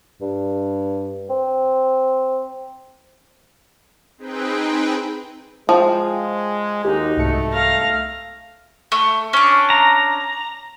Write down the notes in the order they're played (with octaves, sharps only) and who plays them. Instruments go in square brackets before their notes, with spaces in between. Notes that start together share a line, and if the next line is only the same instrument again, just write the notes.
[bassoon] G2
C4
[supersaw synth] C4 D#4 G#4 B4 G5
[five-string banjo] F3 [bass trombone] G#3 [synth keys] F5 G5
[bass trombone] D#2 [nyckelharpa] D#4 F#4 [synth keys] G4
[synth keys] C2 G#2 C#7 [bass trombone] A3
[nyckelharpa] F5 A#5
[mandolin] A3
C#4 D4
[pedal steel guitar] A#5